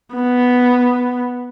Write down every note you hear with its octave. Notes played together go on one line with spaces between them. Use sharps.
B3